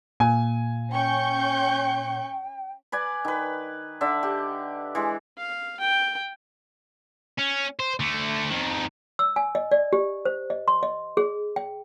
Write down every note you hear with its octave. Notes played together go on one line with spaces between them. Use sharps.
A#2 G#5
C#4 G5 C#6 G6
B4 D5 G#5
D#3 B4
D3 D5 E5
G4
E3 G#3
F5
G5
C#4
C5
D3 A3
F2 D#3
E6
G#5
D#5
D5
G4
C5
D#5
C6
D#5
G#4
G5